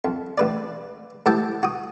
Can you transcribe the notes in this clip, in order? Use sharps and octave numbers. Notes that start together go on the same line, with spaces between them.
F2
A1 B4 D5
A2 E3 G4 F#5 G5 A5
F#4 D#6